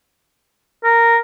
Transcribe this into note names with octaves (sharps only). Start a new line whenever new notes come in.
A#4